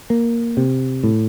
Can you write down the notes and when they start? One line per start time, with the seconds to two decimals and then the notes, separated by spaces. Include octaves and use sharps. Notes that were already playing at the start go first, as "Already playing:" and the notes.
0.10 A#3
0.57 C3
1.04 A2